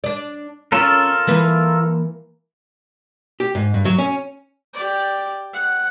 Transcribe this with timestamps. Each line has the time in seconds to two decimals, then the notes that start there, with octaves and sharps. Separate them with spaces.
0.04 D4 D5
0.72 C#4 F4 A4 A#4
1.27 E3 A#3 B4
3.40 G4
3.55 G#2
3.74 G2
3.85 F#3
3.98 C#4
4.74 G4 D5
5.53 F#5